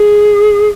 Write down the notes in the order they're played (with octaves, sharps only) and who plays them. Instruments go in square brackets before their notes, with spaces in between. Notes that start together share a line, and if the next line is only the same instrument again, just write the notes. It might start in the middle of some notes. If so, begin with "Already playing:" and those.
Already playing: [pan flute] G#4